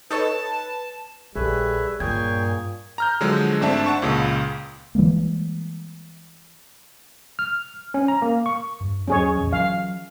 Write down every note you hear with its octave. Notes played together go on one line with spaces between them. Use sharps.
D#4 A4 B4 C#5 A5
A#1 G3 G#4 A4 B4 C#5 E5
G2 A#2 G#4 C#5 G5 G#6
A#5 F6 G6
D3 F3 F#3 G#3
G#1 A3 C4 D4 E5 A5
F#5 A5 C#6
C#2 A#2 C#3
E3 G3 G#3 A#3
F6
C#4
A#5
A#3
C#6
G2
D#2 F#3 C#4 G#4 C#5
F1 A#1 E2
E3 F#3 F5